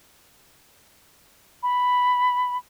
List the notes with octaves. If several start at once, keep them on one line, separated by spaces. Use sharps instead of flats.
B5